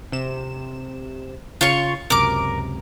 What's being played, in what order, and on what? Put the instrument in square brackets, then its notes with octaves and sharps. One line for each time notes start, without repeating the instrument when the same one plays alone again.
[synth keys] C3 E7
[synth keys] C#3 [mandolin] F4 C#5 C#6
[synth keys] C#2 F#2 C3 [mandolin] A#4 D6